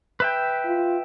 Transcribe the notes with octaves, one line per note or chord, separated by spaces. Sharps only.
B4 E5 G5
F4